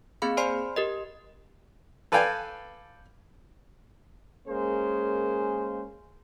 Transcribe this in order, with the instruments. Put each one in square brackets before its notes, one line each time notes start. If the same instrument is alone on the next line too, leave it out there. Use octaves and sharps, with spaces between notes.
[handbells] A#3 C4 G#4 F5 B5
C5 D5 G#5 B5 C6 C7
G4 A#4 D#5
[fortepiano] A4 B4 D5 F5 G5 G#5
[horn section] G#3 A#3 C#4 G#4 A#4 C5